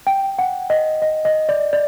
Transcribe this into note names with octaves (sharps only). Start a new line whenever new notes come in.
G5
F#5
D#5
D#5
D#5
D5
D5